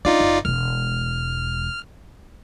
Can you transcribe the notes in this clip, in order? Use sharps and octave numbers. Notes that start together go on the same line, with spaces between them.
D4 D#4 F4 D5
F#1
E1 G#3 F6